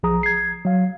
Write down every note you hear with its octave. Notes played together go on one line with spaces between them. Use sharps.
B1 F3 G#4 A#5 D#6
G#6 C7
F#3 F5